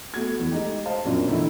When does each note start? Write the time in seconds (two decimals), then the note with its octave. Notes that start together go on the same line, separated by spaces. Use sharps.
0.14 A3 B3 F#4 G#6
0.40 E2
0.51 G#3 A3 D#4 G4
0.85 C5 D#5 F5 A5
1.05 F#2 A#2 F3 F#3 B3 D4
1.28 E2 D3 D#3 A3 D#4 E4